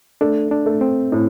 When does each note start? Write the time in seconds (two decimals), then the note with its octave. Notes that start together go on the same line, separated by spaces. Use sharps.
0.21 A3 D4
0.51 D4
0.66 A3
0.81 C4
1.12 A2